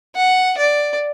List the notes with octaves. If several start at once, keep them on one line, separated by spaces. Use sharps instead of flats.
F#5
D5